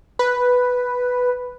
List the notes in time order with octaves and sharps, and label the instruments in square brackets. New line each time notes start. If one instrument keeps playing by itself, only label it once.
[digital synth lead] B4